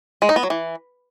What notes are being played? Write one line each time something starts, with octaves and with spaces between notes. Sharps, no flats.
G#3
D#4
B3
F#3
E3